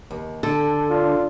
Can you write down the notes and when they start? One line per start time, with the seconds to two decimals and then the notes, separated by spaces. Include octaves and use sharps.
0.11 D#2
0.43 D3 A4
0.88 D4 F4